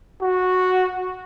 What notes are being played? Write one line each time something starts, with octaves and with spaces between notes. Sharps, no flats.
F#4